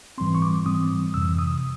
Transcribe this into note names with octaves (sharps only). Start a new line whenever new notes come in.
G#2 E3 G3 C4 C6
C#6
D6
G#2 E3 G3 C4 D#6
F2 C3 E3 E6
D#6